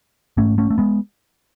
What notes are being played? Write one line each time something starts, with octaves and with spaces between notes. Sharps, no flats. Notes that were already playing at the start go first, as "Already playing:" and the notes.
G#2 A3 C#4
A3 C#4
A3
G#3 B3